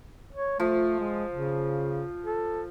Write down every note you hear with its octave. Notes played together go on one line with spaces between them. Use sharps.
C#5
F3 A3
G#3
C#3
A4